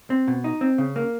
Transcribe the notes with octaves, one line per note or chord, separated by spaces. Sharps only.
C4
B2
D#4
C4
C#3
A#3